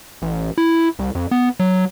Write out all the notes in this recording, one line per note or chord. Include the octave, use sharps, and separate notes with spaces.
A1
E4
C2
F2
B3
F#3